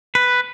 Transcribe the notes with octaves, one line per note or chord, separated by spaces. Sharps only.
B4